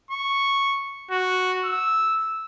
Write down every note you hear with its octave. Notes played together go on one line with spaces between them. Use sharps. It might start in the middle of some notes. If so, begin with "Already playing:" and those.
C#6
F#4
E6